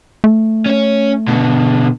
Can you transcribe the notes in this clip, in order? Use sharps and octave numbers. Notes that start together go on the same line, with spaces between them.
A3
C#4 C#5
B2 D3